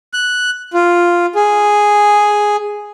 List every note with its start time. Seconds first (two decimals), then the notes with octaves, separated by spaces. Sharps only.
0.14 F#6
0.74 F4
1.35 G#4